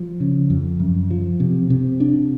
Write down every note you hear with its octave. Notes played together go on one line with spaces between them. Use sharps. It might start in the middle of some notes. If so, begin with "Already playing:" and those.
Already playing: F3
C#3
F2
F#2
F3
C3
C3
D4